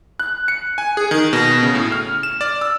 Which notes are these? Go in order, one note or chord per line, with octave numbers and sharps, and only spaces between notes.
F#6
C#7
G#5
G#4
D#3
B2
C#3
A2
F6
E7
D5
E6